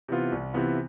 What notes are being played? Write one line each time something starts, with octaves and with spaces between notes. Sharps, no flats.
C3 E3 B3 F4
C2
C3 E3 B3 F4